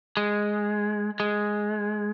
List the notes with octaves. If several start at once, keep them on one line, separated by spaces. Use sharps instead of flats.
G#3
G#3